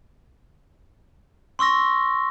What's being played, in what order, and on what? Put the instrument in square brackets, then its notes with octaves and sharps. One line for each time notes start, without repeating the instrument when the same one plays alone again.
[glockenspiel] C6 C#6 E6 A#6